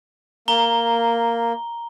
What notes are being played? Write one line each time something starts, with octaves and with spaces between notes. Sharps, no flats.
A#3 A#5 G7